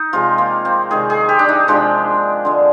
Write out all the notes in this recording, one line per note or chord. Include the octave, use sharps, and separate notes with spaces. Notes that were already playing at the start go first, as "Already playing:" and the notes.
Already playing: D#4
C3 F3 G#3 F4
A#3
C4
C3 D#3 G#3 G#4
G#4
G4
D4
D#4
C3 F3 G#3 D4
D3 F3 G#3